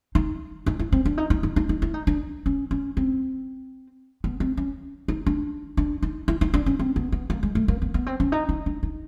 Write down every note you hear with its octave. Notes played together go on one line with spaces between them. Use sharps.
D#4
D#4
E4
C4
D4
D#4
D#4
D#4
D#4
D#4
E4
D#4
D4
C#4
C#4
C4
B3
C4
C#4
D#4
D4
D4
D#4
E4
D#4
D4
C#4
C4
B3
B3
A#3
G#3
A3
A#3
B3
B3
C4
C#4
D#4
D#4
D4
D#4